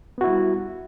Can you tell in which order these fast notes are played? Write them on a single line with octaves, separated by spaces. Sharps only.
B3 F#4 E4 G3